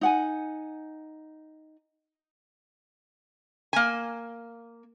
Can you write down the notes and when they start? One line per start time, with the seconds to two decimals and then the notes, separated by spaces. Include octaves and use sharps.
0.01 D#4 F#5 G#5
3.73 A#3 G#5